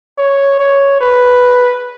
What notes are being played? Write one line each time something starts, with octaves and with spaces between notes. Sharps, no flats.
C#5
C#5
B4